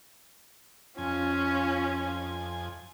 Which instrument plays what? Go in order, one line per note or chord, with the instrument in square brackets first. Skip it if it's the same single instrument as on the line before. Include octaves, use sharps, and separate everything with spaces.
[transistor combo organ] F2 G#5 [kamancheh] C#4 F4